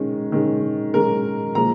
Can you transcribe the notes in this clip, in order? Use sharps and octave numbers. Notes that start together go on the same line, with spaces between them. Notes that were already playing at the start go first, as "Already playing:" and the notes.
Already playing: D#3 G#3 C#4
D#3 G#3 C#4
D#3 G#3 C#4 A#4
A#2 F3 G#3 A#5